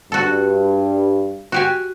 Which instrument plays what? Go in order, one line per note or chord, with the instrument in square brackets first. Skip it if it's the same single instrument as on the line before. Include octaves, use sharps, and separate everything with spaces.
[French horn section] G2 [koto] F#4 A4
[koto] F#4 G4 G#5